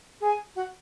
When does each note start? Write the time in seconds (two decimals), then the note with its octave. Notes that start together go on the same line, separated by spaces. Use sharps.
0.21 G#4 G#5
0.55 F#4 F#5